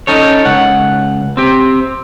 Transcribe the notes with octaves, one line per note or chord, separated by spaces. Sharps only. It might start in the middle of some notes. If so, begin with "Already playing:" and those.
C#4 D#4 A4 C#5
C#2 F#5
C4 G4